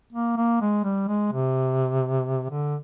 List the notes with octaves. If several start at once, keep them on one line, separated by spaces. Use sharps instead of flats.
A#3
A#3
G#3
G3
G#3
C3
D3